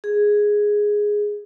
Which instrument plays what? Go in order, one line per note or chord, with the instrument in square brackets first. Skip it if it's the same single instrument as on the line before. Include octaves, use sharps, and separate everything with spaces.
[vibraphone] G#4